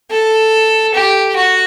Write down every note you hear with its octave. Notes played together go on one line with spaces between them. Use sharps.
A4
G4
F#4